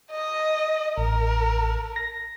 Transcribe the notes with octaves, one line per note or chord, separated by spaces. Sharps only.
D#5
A1 A#4
A#6